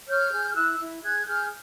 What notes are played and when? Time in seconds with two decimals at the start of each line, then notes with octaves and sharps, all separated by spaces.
0.09 C#5 F6 G6
0.32 G#4
0.49 F6
0.55 E4 E6 F#6
0.79 E4
1.02 G#4 F#6 G#6
1.26 G#4 F6 G6